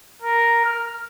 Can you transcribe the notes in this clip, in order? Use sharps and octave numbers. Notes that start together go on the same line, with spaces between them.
A#4
F6